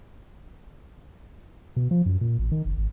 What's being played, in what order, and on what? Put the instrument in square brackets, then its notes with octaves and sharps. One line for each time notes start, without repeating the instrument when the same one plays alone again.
[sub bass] B2
F3
F#2
A#2
A1
D#3
F#1
G#1